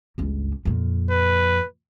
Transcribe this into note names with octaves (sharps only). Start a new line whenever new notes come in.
G1 C#2
F2 A#2
B4